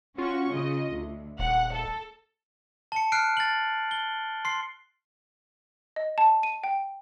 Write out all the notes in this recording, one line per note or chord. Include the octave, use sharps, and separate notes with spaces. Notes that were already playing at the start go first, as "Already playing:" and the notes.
C#4 F4 F#4 C#6
C#3 D#5
D2
D#1 F#5
A4
A5 C#7
F6 F#6 C7 D7
A6 F#7
G7
C6 C7
D#5
A5
D#7
G5